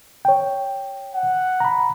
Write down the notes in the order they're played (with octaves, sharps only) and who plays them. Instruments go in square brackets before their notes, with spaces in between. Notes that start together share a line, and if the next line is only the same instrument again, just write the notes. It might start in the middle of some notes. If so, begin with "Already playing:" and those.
[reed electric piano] C#5 G5
[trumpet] F#5
[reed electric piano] A#5 B5